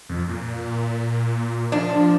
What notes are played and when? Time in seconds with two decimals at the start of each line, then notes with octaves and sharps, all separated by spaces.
0.09 F2
0.28 A#2
1.72 F3 D4